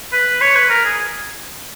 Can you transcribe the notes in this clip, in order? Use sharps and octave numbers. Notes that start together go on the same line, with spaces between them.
B4
C#5
B4
A#4
G#4